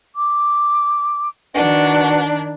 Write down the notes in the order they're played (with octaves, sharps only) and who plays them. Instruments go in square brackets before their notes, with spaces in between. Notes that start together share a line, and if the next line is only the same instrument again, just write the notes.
[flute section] D6
[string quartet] D#3 D4 [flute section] F#4 B4 F#5